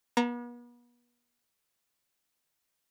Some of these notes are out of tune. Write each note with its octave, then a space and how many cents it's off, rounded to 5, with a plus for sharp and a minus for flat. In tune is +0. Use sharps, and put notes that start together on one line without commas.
B3 -40 A#5 +0